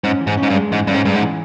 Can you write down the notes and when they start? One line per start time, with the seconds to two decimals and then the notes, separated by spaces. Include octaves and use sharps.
0.04 G#2 C#4
0.21 E3
0.27 G#2
0.37 C#4
0.43 G#2
0.50 G2
0.55 G#3
0.71 G#2 E3
0.87 G2 C#4
0.94 G#2
1.05 G2 G#3
1.15 G#2
1.22 E3